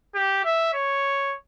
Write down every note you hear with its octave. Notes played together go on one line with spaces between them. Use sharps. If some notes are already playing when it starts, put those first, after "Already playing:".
G4
E5
C#5